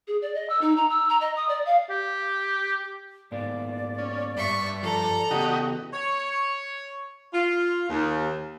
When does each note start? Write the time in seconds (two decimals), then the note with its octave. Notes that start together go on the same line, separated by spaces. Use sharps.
0.08 G#4
0.22 D5
0.35 D#5
0.50 E6
0.61 D#4
0.77 A#5
0.90 E6
1.09 A#5
1.21 D#5
1.36 D#6
1.49 D5
1.66 F5
1.90 G4
3.32 G#2 A#3 B3 D5
3.98 C#4
4.37 G2 E5 C#6
4.83 F3 A4 A#5
5.31 C#3 E3 B3 F#4 G4 D#5
5.93 C#5
7.33 F4
7.89 D#2